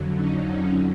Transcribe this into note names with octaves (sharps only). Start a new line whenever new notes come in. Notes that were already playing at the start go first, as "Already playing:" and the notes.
Already playing: F2 D3 F#3
C#4 D#4
C#4 D#4